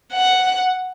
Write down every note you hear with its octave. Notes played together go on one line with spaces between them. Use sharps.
F#5